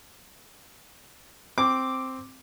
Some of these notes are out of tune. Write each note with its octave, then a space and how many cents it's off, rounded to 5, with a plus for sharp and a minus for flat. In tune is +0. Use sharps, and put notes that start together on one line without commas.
C4 +0 D6 +0